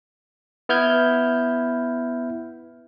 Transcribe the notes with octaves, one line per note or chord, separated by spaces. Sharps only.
B3 E4 F6 G6 G#6